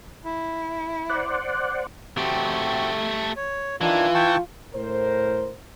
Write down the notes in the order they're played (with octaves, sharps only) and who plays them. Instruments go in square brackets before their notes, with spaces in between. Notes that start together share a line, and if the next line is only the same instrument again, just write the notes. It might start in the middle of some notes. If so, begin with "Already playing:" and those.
[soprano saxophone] E4
[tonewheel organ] C5 D5 F#5
[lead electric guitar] A3 G4 [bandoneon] C4 F#4
[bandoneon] C#5
[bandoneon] D#3 D4 [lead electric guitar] E3 [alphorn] F4
[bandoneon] G5 A5 C#6
[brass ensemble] A2 A#4 C5